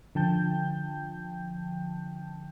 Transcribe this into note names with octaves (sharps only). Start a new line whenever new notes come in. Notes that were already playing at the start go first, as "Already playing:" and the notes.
D3 F3 G5 A5 G6